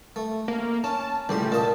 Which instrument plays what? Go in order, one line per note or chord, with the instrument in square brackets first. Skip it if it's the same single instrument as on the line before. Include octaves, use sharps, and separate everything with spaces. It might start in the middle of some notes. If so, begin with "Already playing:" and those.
[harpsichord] A3
[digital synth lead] A#3
[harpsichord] C#4 [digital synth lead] A5
[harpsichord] C#2 A2 C6 [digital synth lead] G3
[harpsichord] A#2 D#5 [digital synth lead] A5